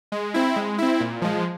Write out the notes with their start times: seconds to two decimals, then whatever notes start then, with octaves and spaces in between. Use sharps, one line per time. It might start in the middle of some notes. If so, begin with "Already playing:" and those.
0.12 G#3
0.34 C4 E4
0.56 G#3
0.78 C4 E4
1.00 A#2
1.22 F3 G#3